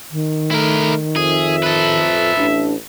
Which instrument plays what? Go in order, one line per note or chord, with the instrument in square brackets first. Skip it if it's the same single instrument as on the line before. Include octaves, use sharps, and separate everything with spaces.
[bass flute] D#3
[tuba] A3 [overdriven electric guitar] E4 A#4
[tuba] F2 [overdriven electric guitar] G#4 [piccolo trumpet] E5
[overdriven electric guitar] A4 B4
[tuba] A1 [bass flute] D4